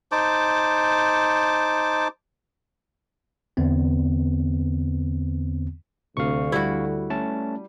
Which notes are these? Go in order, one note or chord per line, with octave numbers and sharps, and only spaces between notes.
D#4 C5 A5 D6
E2 D3 B3 C4
D2 C3 F5 C#6
G3 E4 F#4
A3 C#4 A5